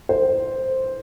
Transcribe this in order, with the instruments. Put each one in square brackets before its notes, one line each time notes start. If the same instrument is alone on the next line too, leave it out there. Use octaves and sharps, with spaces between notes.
[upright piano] C5